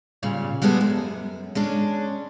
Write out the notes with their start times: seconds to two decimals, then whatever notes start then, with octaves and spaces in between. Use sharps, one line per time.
0.23 A#2 C#3 G3
0.62 G3 G#3 B3 G#4 A4
0.81 F#2
1.55 G#3 C#4 D4